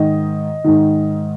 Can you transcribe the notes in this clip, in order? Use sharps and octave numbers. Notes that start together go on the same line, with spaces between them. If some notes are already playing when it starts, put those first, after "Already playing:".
Already playing: G#2 D#3 D#5
G#2 D#3